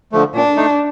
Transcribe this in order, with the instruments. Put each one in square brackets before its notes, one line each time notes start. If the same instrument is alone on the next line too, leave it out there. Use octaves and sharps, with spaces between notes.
[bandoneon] D3 F3 A3
[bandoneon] A#2 [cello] D4
[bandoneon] A3 D#4